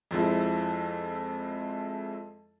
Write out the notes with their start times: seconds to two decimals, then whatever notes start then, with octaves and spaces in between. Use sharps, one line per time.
0.11 F2 F3 G#3 E4